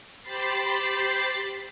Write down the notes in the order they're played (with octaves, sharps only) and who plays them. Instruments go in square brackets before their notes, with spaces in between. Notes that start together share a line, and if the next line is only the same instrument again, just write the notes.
[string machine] G4 C5 B5 A6 C7